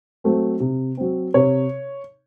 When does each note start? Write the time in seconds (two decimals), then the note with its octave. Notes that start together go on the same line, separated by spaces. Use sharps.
0.24 F#3 A3 C4
0.60 C3
0.97 F#3 C4
1.34 C3 C#5